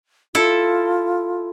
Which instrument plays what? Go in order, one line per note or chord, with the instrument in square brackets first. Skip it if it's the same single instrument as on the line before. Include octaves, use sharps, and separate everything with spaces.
[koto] E4 A4 [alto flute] F4